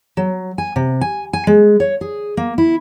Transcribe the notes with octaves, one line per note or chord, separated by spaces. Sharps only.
F#3
G#5
C3
G#5
G#5
G#3
C#5
G#4
A#3
E4